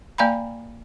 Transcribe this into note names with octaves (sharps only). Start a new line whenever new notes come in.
A#3 D5 F5 G#5 A#5 B5